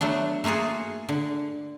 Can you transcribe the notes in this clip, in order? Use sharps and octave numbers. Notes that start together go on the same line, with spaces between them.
F#3 A3 B3 D4
A3 A#3 F4 F#4 G#4
D3